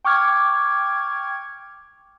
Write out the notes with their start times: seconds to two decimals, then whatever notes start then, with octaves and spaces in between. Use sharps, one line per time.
0.04 G5 C#6 D6 F6 G#6